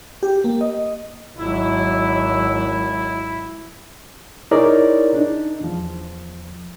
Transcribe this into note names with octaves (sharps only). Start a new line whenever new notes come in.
G4
A#3
D#5
G#1 F#3 E4
D#4 E4 G#4 A#4 C#5 D5
D4 D#4
E2 F3